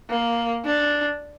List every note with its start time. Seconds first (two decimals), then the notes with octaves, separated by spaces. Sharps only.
0.10 A#3
0.65 D4